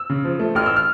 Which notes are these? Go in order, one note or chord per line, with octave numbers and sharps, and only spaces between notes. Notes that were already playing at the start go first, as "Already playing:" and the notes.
Already playing: E6
C#3
F3
A3
A1 F6
E6
F6